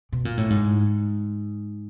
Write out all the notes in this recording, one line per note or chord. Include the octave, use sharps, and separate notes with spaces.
B2
A#2
A2
G#2